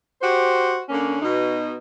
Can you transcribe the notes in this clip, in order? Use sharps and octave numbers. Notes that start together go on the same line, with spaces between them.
F#4 G4 C5
D3 A#3 C#4
B2 D#4